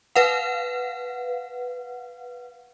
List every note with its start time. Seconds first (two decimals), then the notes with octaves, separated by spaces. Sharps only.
0.16 B4 F5 F#5